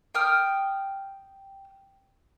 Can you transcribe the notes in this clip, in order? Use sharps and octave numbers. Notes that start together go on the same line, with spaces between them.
G5 D#6 F6